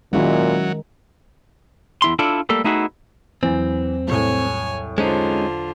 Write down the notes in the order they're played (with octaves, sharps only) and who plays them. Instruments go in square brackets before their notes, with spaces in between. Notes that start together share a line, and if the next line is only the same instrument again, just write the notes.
[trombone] A#2 [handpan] D#3 G#3 [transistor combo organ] F#3 [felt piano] C#4 E4 F#4
[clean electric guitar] E2 E4 C6
D4 E4 F4 A4 D5
G3 A3 A#3 A4
A3 B3 D#4 E4 F#4 G#4
[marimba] E2 F#3 [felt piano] E3 [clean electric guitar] C4
[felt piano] C2 A2 [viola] C#5 G#5
[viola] D3 F4 [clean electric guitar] G#3 C#4 D#4 [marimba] C5 A#5